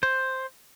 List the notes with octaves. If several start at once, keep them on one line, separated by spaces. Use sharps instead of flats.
C5